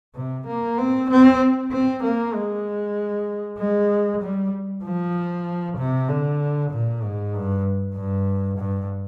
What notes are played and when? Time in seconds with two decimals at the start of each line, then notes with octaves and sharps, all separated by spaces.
0.15 C3
0.47 A#3
0.78 C4
1.10 C4
1.71 C4
2.03 A#3
2.34 G#3
3.58 G#3
4.22 G3
4.84 F3
5.78 C3
6.08 D3
6.71 A#2
7.03 G#2
7.34 G2
7.95 G2
8.58 G2